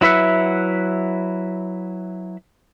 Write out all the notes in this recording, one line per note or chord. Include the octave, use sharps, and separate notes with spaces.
F#3 E4 B4 E5 F#5